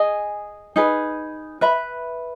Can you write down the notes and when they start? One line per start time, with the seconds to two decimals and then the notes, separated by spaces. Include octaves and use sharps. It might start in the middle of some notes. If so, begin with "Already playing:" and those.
Already playing: G#4 D#5 G#5
0.76 D#4 G#4 B4
1.61 B4 E5 B5